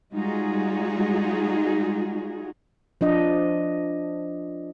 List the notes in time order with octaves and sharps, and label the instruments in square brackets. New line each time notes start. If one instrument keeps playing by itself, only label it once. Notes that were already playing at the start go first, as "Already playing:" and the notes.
[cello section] G3 G#3 D#4 F4 F#4 G#4
[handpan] F3 D4 D#5